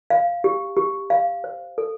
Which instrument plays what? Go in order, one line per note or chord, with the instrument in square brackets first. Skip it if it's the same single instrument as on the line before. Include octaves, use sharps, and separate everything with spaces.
[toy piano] F5
G4
G4
F5
C5
A4